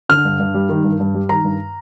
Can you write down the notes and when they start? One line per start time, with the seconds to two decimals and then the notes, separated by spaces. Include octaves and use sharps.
0.09 D3 F6
0.25 G2
0.40 G2
0.54 G3
0.69 D#3
0.84 G2
1.00 G2
1.14 G3
1.29 D#3 A#5
1.45 G2